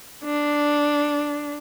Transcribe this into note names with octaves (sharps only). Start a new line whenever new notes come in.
D4